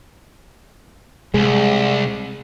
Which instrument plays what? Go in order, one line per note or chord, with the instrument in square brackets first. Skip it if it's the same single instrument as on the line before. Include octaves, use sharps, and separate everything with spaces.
[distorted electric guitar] C2 [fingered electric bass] G#3